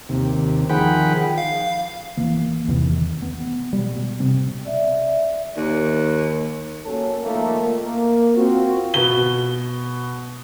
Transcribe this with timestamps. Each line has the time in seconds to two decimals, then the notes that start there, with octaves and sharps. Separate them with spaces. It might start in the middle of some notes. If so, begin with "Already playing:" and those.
0.09 D#2 C3
0.70 D#3 F3 G#4 F#5 G5 B5
1.38 F5
2.17 D1 E3 A#3
2.68 E2 C3 D#3 E3
3.22 B3
3.73 B2 G3
4.20 C3 C4
4.65 D5 E5
5.57 D#2
6.84 F#3 A#3 C#4 A4
7.22 D#3 F3 A3 A#3
7.72 A#3
8.34 C4 F4 F#4
8.94 B2 G7